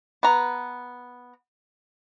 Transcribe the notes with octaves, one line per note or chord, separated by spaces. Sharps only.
B3 A#5